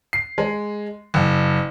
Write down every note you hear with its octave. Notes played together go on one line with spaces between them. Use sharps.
C7
G#3
F#1